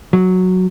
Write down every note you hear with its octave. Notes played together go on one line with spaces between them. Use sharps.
F#3